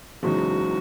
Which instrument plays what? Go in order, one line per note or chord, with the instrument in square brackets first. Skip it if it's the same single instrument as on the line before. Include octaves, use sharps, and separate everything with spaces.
[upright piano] F#1 E2 C#3 G#3 D#4 [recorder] F#4